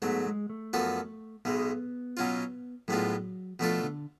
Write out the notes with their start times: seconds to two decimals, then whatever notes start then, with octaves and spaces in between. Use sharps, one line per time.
0.02 G#2 F#3 A3 B3
0.26 G#3
0.50 A3
0.73 F#2 F3 B3 F#4 A4
1.45 B1 B2 G#3 B3
2.17 B2 F#3 C#4 F4
2.88 A2 F#3 G#3 B3 D4 F4
3.59 B2 F3 A3 D4 F4 A4
3.84 D3